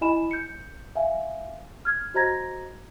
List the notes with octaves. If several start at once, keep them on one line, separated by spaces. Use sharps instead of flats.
E4 D#5 G#5 B5 E7
G6 C#7
E5 F5 G#5
F6 G#6
F#4 C5 D#5 A#5 G#6 A#6